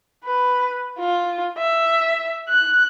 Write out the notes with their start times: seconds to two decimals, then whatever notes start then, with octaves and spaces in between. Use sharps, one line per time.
0.24 B4
0.99 F4
1.58 E5
2.49 F#6